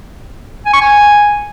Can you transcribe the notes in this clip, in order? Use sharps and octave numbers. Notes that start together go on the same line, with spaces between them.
G#5
C#6
G#5